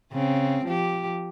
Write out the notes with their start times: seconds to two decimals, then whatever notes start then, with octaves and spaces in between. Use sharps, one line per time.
0.12 C#3 C4
0.65 F3 G4